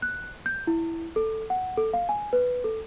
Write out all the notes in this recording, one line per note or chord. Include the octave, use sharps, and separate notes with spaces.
F#6
G6
E4
A4
F#5
A4
F5
G#5
B4
A4